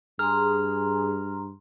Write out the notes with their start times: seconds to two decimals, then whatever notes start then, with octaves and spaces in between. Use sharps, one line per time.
0.19 G2 G#4 A#5 C6 F6